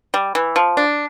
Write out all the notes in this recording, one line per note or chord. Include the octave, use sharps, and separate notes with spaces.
G3
E3
F3
D4